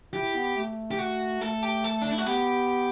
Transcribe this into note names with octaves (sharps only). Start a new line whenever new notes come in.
E4 G4
B3
A3
G4
F#4
A3 A4
G4
A4
D4
E4
F#4
B3 G4